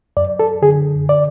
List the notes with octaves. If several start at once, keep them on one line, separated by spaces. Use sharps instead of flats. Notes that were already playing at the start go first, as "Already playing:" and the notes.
F#2 D5
A4
D3 G#4
D5